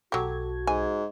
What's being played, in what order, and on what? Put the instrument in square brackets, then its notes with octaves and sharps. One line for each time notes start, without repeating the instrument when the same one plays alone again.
[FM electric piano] B1 A4 G#6 [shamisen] F#3 G4 [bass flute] F#4
[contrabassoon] G#2 [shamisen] G#5